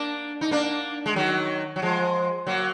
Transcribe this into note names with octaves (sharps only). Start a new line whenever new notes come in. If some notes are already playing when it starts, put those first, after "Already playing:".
Already playing: A#3 D4
D#4
A#3 D4
G#3
D#3 F#3
F#3
F3 G#3
F#3 A#3